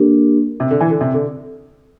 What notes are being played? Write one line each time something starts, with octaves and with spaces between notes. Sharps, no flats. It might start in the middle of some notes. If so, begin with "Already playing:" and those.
Already playing: D3 A#3 D4 G4 A#4
C3
D3
E3
D3
C3
D3